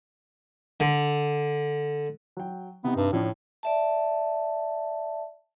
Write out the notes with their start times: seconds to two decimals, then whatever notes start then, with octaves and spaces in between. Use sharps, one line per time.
0.80 D3
2.37 F#3 G5
2.84 C3 B3 D#4
2.96 G2
3.13 A2 F3 C#4 D4
3.63 D5 E5 A5